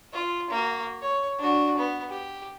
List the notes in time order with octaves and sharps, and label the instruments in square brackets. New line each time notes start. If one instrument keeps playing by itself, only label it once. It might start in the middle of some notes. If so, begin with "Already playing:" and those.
[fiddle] F4
A#3 F#4
C#5
D4 F#4
B3
G4